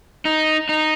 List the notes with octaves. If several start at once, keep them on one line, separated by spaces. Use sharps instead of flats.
D#4
D#4